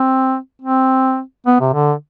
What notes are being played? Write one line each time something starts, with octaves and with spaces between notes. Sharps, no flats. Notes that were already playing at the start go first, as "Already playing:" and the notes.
Already playing: C4
C4
B3
C3
D3